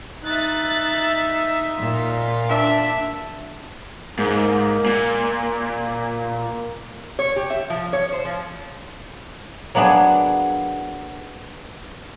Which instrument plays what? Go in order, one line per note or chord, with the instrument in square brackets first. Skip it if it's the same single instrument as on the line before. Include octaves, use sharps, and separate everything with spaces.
[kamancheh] D#4 E5 [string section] F#6 A6
[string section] A#2 F4
[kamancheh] D4 E5
[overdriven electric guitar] G#2 [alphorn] A#3
[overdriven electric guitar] A#2
[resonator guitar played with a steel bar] C#5
G4
E5
F3
C#5
C5
F3
[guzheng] F#3 A#3 B3 D4 G#4